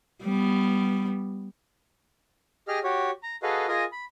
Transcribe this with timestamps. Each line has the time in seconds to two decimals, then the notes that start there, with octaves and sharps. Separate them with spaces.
0.23 G3 B3
2.68 G4 G#4 D#5 F6
2.84 F#4 G4 C#5
3.23 A#5
3.43 F#4 G#4 A4 B4 D#5 F5
3.68 F4 G#4 A#4 D#5 G#5 D#6
3.92 B5